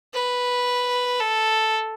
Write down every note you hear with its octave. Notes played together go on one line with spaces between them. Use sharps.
B4
A4